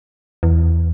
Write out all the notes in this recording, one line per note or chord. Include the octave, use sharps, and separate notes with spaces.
E2